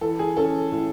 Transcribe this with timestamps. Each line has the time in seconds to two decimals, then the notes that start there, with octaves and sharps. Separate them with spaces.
0.01 E3 A4
0.19 G#4
0.37 C#4 A4
0.72 A2